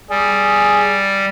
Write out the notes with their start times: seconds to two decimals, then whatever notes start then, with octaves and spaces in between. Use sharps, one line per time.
0.11 G3 G#4